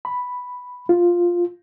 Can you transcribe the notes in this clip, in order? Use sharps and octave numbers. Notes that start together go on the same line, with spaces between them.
B5
F4